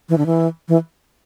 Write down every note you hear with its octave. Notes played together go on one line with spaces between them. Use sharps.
E3
D3
E3
E3